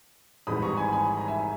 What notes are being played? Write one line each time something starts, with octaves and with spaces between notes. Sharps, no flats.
G#1 G#2 E3 G3 B5 D#6
A#5 C#6
G#5 B5
G#5 B5
A#5
E5 G#5